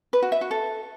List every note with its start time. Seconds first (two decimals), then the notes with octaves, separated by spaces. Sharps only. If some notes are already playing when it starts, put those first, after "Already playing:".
0.13 B4
0.22 F#4
0.32 E5
0.41 F#4
0.51 A4